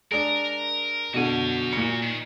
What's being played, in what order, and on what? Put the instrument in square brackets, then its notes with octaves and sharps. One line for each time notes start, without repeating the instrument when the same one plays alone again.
[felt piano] G#3 D4 [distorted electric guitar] A#4
[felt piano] B2 D3 [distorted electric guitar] F#4 G#5
[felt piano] A#2 C#7
[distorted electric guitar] D#3